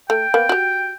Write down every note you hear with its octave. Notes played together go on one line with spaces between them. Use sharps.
A3 G5
A#3 B3
F#4 G4